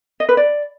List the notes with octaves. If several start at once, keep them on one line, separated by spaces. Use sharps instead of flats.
D#5
B4
D5